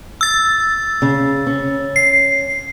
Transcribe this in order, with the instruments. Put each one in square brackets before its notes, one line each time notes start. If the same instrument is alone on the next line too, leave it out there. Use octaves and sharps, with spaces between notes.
[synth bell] E6 A6
[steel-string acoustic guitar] C#3
C#4
[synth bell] C7